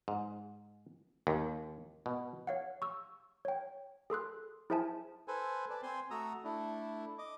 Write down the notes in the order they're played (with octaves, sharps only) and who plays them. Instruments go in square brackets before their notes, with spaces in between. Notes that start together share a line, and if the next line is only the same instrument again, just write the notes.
[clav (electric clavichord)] G#2
D#2
B2
[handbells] C#5 F5 F#5
C#6 E6
C#5 G5
G#4 A4 C6 F#6
E4 G#4 C5 E5 G#5 A5
[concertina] A4 B4 C5 G#5
B4 D5 A5
C4 C5 G#5 C6
A3 F#4 A#5 D#6 E6
A3 D4 E4
D#5 D6